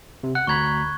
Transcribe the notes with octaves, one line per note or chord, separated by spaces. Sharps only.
C3
F#5 F#6
D2 A#5 B5 C#6 G#6